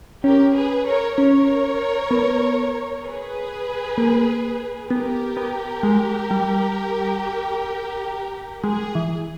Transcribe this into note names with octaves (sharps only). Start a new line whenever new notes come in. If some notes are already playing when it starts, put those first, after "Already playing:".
C#4 G4 A#4
G#4 B4
A#4 C#5
C#4 A#4 C#5
B3
G#4 B4
A#3
B3 G4 A#4
B3
G#3
G3
G#3 G#4
E3